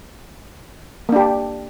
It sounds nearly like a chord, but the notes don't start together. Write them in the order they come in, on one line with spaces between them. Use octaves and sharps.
A#3 D4 G4